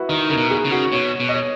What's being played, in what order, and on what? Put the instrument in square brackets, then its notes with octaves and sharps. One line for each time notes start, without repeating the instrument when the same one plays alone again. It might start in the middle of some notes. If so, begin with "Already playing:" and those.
Already playing: [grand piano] E4 F#4 B4
[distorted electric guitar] D#3 [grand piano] D#4
[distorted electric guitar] C#3 [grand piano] A#4
[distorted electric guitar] B2
[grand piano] G#4
[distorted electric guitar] C#3
[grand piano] F#4
[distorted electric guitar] B2 [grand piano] C#5
[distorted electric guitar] B2
[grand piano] D#5
C#5